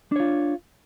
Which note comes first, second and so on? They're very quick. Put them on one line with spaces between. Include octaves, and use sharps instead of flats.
D4 C#5 F4